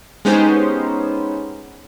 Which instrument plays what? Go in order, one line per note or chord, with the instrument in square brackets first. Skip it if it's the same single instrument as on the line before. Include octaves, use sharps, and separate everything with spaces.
[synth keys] G#3 B3 C#4 D#4 G4 C5